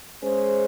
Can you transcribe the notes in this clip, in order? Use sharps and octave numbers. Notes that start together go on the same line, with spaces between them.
G#3 C#4 G#4 C5